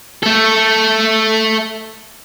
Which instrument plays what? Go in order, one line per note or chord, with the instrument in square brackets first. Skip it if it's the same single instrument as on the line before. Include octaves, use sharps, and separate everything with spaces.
[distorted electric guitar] A3 A4